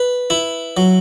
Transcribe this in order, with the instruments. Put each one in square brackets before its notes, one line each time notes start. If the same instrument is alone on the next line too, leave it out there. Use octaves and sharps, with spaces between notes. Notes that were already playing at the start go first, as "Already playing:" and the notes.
Already playing: [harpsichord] B4
E4
F#3